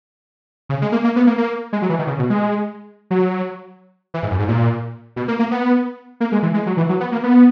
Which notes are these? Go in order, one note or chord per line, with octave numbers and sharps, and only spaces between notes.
C#3
G#3
A#3
A#3
B3
A#3
A#3
G#3
F#3
E3
D#3
C#3
B2
G#3
F#3
E3
G#2
F#2
G#2
A#2
B2
A#3
A#3
B3
A#3
G#3
E3
G#3
F#3
E3
F#3
B3
A#3
B3